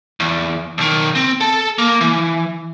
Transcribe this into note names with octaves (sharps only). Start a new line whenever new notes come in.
E2
B1 D#3
C4
A4 A5
A#3
E3